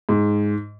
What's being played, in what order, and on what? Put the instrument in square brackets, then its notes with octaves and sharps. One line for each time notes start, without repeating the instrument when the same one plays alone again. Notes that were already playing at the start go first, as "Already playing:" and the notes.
[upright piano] G#2